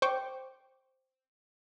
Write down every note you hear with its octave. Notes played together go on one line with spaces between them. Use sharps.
C5 G5 C#6 D6